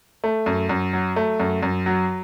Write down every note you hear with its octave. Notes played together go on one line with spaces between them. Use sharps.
A3
F#2
F#2
F#3
A3
F#2
F#2
F#3